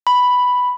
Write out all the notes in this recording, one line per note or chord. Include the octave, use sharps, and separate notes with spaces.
B5